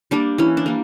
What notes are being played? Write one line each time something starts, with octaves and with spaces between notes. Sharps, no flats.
G3 A#3 D4
E3 C#4
D4
G3 A#3